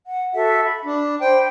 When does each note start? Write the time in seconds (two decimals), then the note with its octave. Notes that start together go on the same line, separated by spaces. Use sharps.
0.07 F#5
0.34 F#4 A4 E5
0.64 B5
0.85 D4
1.21 C5 G5 B5